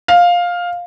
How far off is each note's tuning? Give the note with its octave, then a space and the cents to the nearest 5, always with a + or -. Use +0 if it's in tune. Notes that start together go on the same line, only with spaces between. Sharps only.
F5 +10